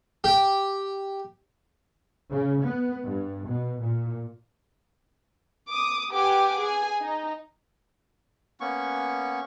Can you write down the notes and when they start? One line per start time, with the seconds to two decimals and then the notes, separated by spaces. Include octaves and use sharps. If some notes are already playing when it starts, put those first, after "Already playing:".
0.24 G4
2.31 C#3
2.62 B3
3.04 G2
3.46 B2
3.80 A#2
5.69 D6 D#6
6.11 G4 B4 F#5 G#5 D6
6.58 G#4 G#5
7.02 D#4
8.60 A#3 B3 C#4 C#6